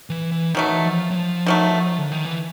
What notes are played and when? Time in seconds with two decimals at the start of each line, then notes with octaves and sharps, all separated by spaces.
0.10 E3
0.32 E3
0.55 D#3 E3 F#3 A3
0.85 F3
1.11 F#3
1.15 F3
1.46 D#3 F#3 A3
1.98 D3
2.12 D#3
2.25 E3